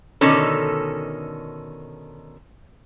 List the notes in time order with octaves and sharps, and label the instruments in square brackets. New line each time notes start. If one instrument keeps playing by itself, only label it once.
[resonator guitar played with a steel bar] B2 D3 D#3 C#4 A4